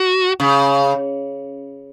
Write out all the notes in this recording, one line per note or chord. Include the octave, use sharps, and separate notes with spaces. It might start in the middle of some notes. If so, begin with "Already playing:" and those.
Already playing: F#4
C#3